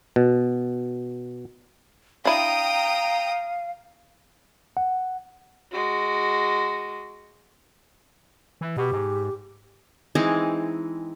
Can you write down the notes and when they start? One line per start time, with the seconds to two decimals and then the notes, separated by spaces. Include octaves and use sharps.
0.16 B2
2.25 D4 E4 F5 G5 A#5 D#6
4.77 F#5
5.72 G#3 F#4
8.61 E3
8.77 B2 G4
8.92 G#2
10.15 E3 G#3 C4 D#4